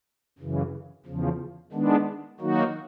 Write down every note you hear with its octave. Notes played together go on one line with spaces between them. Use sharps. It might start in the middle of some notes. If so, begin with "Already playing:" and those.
F#2 C#3 E3
E2 C#3 F3
D#3 G#3 B3 D4
D#3 F#3 A#3 D#4 F#4